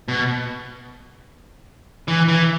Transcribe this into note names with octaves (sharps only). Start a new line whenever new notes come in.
B2
E3
E3